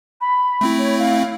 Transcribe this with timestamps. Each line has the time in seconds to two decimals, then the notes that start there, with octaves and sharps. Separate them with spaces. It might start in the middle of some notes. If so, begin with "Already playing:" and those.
0.21 B5
0.61 A3 C4 E4
0.78 C#5
0.98 F5